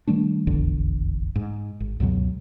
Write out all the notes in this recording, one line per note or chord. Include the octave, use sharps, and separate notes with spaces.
D#3 G3 A3 D4
F1 A#1 E2 D3
G#2
G#1
C#2 F#2 B2 F#3